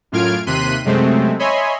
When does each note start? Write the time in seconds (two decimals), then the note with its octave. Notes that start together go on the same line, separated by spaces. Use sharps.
0.12 F#2 A2 F4 F6 G#6 D7
0.46 D#2 C3 C6 F#6 B6 D#7
0.85 F#2 C3 G#3 A3 C4
1.39 C#5 D#5 E5 G#5 B5 C6